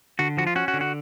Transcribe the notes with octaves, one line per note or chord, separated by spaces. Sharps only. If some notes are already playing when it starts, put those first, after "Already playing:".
D3 F#4
F3 F#4
F4
C#4 F#4
F#4
D3
F#4